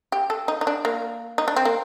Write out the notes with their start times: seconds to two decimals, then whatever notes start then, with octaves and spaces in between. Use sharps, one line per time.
0.12 G4
0.30 A4
0.48 D#4
0.61 D#4
0.67 D4
0.85 A#3
1.38 D#4
1.48 D4
1.56 C4
1.65 A#3